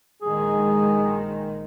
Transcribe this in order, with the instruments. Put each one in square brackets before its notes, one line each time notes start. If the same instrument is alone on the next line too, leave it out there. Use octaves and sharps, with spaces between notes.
[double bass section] A#1 D#3 G#3 [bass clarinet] G#4